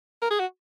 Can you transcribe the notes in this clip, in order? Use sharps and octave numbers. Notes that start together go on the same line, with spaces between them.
A#4
G#4
F#4